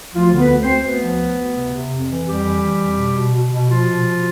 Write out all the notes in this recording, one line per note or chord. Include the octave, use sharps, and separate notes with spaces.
D2 F3 F4
D3
B3 B4
D2
C4 C5
D2
D2 B3 B4
F3
D2
D2
C3
C3
F2
E3
F2 G3 G4
E3
E3
F2
B2
B2
B2
B2
B2 F3 F4
B2
B2